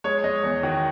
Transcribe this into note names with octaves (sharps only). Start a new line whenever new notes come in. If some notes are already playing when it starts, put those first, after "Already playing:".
G#3 C#5
G#3 D#5
E2 C#5
D#3 F#4